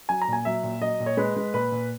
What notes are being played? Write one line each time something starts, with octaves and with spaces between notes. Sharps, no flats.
F#3 G#5
A#5
A#2 G#5
F#3 E5
A#2
F#3 D#5
A#2
C#5
G#3 B4
G#3
A#2 B4
A#2